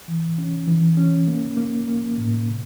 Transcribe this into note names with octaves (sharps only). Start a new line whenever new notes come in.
E3
C#4
E3
C#4
A#3
A#3
A#3
A2
C3